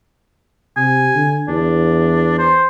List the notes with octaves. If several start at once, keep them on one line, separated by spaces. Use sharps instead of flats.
C3 G#5
D3
E2 D4
C5